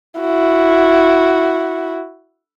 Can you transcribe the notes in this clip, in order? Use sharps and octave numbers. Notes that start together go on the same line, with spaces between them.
E4 F#4